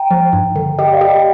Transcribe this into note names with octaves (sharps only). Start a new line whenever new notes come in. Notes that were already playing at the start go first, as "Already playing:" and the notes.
Already playing: G5 A#5
F3
G2
D3
G4 D#5 G5
D5 F5
G4
D#5 G5